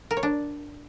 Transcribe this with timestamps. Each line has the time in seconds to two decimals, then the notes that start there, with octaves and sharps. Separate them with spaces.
0.11 A#4
0.17 C#5
0.23 D4